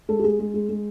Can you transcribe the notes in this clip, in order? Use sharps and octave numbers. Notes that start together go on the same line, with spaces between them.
G#3 A4
G4
G#3 G#4
G#3
G#3
G#3